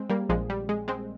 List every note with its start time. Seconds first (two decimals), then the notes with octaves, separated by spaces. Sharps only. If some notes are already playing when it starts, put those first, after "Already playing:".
Already playing: G#3 C4
0.10 G3 A#3
0.29 A#1 A#2 F3 G#3
0.50 G3
0.69 G#3
0.88 G#3 C4